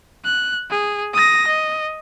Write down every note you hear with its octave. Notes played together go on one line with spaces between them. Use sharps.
F#6
G#4
D#6 A#6
D#5